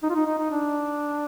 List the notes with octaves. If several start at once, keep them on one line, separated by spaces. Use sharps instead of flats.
D#4
F4
D#4
D#4
D#4
D4